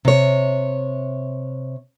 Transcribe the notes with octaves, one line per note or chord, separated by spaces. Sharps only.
C3 C#5